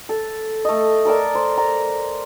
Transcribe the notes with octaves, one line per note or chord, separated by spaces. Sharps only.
A4
A3 D#5
A4 A#4 D5 A5
C5
A#5